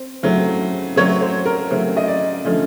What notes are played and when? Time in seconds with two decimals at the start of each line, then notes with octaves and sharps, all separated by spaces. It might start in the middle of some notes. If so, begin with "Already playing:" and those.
Already playing: C4
0.23 C#3 F#3 A3 C4
0.96 C#3 F#3 A3 C4 C#5
1.22 C5
1.45 A#4
1.71 C#3 F#3 A3 C4
1.97 D#5
2.07 D5
2.45 D3 F3 A3 C#4